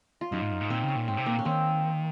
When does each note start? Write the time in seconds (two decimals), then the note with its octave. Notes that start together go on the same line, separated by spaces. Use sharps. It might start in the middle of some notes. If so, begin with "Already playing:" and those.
0.21 F4
0.32 F#2 D#4
0.42 G#2
0.51 F#2
0.61 G#2
0.70 A#2 C4
0.83 C#3
0.88 C#4
0.95 A#2
1.08 G#2 C4
1.17 C3
1.26 A#2 A#3
1.39 C#4
1.45 D#3 C4